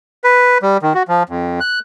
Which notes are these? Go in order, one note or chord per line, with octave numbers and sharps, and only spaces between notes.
B4
G3
D#3
F#4
F3
F2
F#6